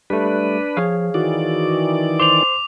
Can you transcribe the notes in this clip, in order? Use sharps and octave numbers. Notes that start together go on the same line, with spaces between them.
G3 A3 D4 B4
F3 G#4 C#5 F5
D#3 E3 F#4 D5
C5 C6 D6 F7